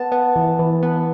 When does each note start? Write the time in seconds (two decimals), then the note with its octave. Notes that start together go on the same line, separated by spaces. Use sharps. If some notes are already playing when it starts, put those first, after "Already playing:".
Already playing: B3 A5
0.12 B3
0.36 E3
0.59 E3
0.83 B3